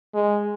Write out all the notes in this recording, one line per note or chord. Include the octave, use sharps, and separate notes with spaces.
G#3